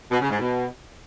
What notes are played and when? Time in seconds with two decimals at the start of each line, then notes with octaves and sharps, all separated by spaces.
0.11 B2
0.20 C#3
0.30 G#2
0.39 B2